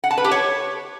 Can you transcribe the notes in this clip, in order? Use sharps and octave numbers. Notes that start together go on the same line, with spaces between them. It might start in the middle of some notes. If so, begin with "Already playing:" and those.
F#5
A5
B4
G4
C#5